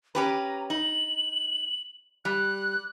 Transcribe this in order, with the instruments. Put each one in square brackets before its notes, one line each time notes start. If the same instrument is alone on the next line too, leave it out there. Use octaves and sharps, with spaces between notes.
[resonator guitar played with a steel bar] C#4 G4 B4 [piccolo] A#5
[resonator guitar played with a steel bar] D#4 [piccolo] F#7
[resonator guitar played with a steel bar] G3 [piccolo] F#6